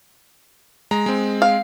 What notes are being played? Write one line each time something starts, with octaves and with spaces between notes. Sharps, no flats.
G#3 A#5
G#3 C4
F5